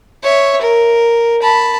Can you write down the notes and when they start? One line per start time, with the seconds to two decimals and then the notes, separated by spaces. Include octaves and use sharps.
0.23 C#5 E5
0.61 A#4
1.42 A5 B5